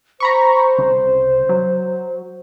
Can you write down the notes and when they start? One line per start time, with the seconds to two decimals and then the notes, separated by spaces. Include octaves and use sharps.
0.20 C5 A#5 B5 C#6
0.78 C2 C#3
1.49 F#3